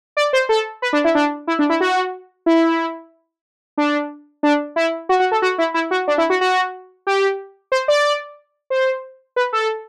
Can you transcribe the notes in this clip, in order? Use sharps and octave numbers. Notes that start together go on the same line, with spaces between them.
D5
C5
A4
B4
D4
E4
D4
E4
D4
E4
F#4
E4
D4
D4
E4
F#4
F#4
A4
F#4
E4
E4
F#4
D4
E4
F#4
F#4
G4
C5
D5
C5
B4
A4